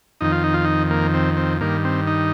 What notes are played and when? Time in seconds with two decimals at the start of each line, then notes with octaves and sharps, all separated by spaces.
0.21 F2 D#3 D#4
0.32 F4
0.44 D#4
0.54 F4
0.65 D#4
0.91 A#3
1.14 C4
1.37 C4
1.61 G2 D#3 A#3
1.84 C4
2.07 D#4